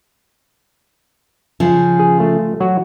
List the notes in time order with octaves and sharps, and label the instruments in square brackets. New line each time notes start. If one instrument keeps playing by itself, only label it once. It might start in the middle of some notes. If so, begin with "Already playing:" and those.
[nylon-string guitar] C#3 F3
[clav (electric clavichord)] G#4
A3
F#3 F#4